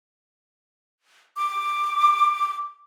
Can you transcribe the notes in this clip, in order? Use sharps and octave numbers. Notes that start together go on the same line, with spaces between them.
D6